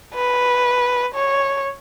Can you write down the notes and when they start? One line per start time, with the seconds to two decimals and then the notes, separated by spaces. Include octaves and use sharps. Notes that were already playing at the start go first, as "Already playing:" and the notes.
0.15 B4
1.15 C#5